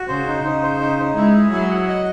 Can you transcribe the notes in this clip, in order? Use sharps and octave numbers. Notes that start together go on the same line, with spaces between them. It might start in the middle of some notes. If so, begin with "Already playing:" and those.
Already playing: F#4
C#3 C5
D#4
C#3 D#4
C5
D#4
D#4
G#3 E4
G#4
F#3 E4
F#5
D#5